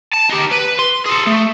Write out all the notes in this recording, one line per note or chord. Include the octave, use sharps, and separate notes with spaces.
A5
D#4 G4
B4
C6
G#4 A4
A3